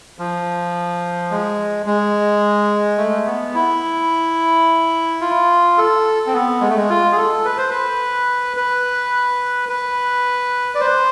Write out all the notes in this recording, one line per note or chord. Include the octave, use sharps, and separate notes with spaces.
F3
G#3
G#3
A3
B3
E4
F4
A4
C4
B3
G#3
A3
G#3
F4
G#4
A4
B4
C5
B4
B4
B4
D5
C5